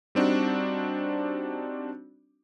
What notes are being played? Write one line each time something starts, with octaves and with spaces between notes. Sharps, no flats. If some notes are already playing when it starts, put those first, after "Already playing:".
G3 C4 D4 D#4 F#4